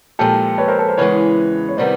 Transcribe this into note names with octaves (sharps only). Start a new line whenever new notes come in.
A#2 F3 G#3 G4 A4
B4 C#5
A#4 C5
A4 B4
A#4 C5
E2 C#3 E3 G#3 B4 C#5
C#5
C3 D#3 G3 B3 C5 D5